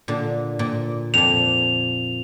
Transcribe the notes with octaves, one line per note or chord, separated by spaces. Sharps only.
A#2 D3
A#2
F2 A#2 F7